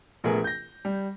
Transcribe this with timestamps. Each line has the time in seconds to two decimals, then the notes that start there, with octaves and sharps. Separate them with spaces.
0.24 A#1 A3 B3 G#4 A#4 G#5
0.44 G6 A#6
0.85 G3